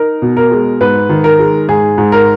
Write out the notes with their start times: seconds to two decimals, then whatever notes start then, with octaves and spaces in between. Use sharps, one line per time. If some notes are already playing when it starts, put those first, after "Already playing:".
Already playing: D#4 A#4
0.22 B2
0.37 A#4
0.51 G#3
0.81 G#2 B4
1.09 D#3
1.24 A#4
1.39 G#3
1.68 G#2 G#4
1.98 G#2
2.12 A#4